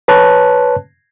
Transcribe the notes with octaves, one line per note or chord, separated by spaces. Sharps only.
B4 C#5 A5 F#6